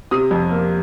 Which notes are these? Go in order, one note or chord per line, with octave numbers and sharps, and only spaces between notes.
C3 D#6
F2
A#3